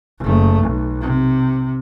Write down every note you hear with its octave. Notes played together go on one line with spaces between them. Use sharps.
F#1 A3
B1
C3